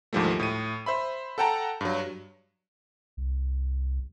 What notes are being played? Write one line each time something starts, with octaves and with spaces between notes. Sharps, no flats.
D2 G#2 D#3 F3 G3 A3
A2 D#7
C5 E5 B5
A4 F#5 G5 A5 A#5
G2 F#3
C2